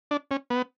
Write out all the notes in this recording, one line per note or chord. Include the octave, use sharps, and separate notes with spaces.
D4
C#4
B3